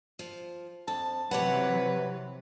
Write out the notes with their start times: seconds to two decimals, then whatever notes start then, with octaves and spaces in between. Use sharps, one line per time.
0.19 F3
0.88 F2 A5
1.31 C3 E3 F#3 G4 B4 C#5 F#5